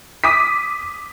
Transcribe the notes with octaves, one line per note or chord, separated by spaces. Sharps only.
D6 D#6 B6